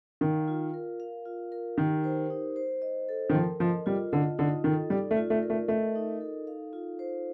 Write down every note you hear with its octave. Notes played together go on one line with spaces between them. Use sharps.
D#3 F5
F4
A#4
F5
F4
A#4
D#3 G4
C5
D#4
C5
D#5
A4
D#3
F3 A#4
F3 D#5
G3 F4
D3 D#5
D3 D#4
D#3 A4
G3 D5
A3
F4
A3
A#4
A3
A3 D#5
D#4
A4
F5
F4
C5